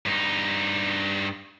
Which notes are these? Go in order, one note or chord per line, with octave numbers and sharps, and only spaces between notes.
G2 D#4